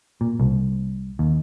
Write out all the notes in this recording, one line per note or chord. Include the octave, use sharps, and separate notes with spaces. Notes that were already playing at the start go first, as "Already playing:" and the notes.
A#2
C2
D#2